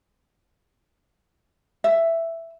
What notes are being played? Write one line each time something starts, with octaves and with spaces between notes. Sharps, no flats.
E5